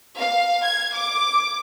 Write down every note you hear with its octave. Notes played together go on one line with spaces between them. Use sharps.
F5
G#6
D6